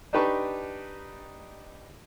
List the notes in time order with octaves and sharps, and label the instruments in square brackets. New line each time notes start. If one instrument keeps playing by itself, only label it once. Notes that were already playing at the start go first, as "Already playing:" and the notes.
[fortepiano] D4 D#4 G4 B4 A5 C#6